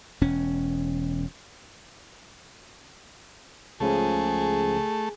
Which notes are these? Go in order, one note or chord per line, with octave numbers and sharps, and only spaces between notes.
E1 C#4
C#2 C#3 F3 A3 G#4